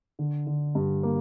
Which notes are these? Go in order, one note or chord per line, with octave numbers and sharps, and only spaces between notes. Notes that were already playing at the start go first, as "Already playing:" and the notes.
D3
D3
G2
A#3